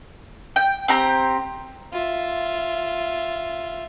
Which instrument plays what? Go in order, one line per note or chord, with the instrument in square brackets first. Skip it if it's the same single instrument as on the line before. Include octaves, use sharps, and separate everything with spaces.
[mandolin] G5
C4 G4 A#5
[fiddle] F4 E5